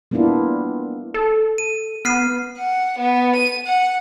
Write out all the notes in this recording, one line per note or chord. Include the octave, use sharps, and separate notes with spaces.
G3 A#3 B3 D4 E4 F4
A4
D#7
B3 F6 C7 D#7
F#5
B3
D#7
F#5